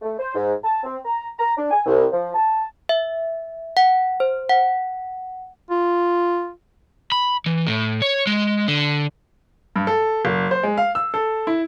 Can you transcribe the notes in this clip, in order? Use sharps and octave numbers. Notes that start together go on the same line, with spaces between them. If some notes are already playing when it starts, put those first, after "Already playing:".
A3
C5
G#2
A5
C4
A#5
A#5
D4
G#5
C2
F3
A5
E5
F#5
C5
F#5
F4
B5
E3
A2
C#5
G#3
D3
G2
A4
F#1
C5
G#3
F5
E6
A4
E4